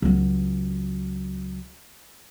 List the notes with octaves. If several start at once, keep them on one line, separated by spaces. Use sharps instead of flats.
C#2 F#3